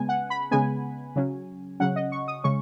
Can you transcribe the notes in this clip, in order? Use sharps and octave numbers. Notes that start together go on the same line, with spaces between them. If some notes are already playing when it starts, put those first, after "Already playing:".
Already playing: C#3 G#3 B3 G#5
F#5
B5
C#3 G#3 B3 G#5
C#3 F#3 C#4
C#3 F#3 C#4 F#5
D#5
C#6
D#6
C#3 G#3 C#4 C#6